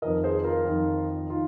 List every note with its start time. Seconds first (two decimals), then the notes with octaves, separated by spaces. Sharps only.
0.02 F2 D#3 A#4 D#5
0.23 G#4 C5
0.44 F4 A#4
0.65 F2 D#3
1.30 D#3 F4